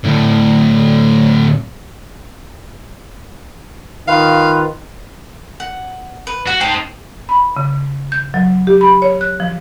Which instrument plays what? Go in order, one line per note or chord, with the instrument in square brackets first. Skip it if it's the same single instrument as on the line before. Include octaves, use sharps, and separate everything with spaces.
[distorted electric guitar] D2 A2
[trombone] D#3 [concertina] F4 B4 [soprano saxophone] F5
[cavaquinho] F#5
B4
[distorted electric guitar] F#4 [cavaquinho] F#5
[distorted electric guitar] D#4 C5 [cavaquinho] G5 A5
[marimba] B5
C#3
G6
F#3
G4
B5
C#5
F#6
F3